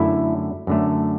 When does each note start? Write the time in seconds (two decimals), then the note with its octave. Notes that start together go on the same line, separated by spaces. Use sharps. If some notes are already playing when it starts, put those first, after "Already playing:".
Already playing: F#2 D3 A3 E4
0.67 F#2 D3 A3